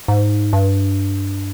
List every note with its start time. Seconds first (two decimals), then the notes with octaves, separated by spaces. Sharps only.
0.08 G#2
0.53 G2